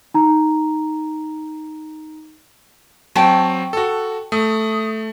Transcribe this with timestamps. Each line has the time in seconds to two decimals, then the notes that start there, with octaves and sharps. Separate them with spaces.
0.14 D#4 A#5
3.15 F#3 C4 G5 A5 C#6
3.73 F#4 A4
4.32 A3 D#6